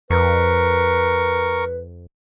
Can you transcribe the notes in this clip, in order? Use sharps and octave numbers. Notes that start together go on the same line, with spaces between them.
F2 A#4 B4 C#6